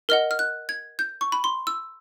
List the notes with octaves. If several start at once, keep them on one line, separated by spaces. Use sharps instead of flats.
A#4 D#5 F#5 F6
F6
F#6
G#6
G6
C#6
B5
C6
E6